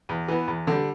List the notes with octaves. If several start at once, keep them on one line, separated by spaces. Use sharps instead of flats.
E2
E3 B3
E2
D3 G3